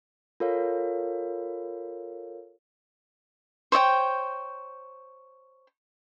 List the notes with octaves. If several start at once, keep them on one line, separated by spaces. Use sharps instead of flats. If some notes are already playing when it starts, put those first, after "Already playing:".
F4 A4 A#4 C#5 F5
C5 C#5 D#5 G5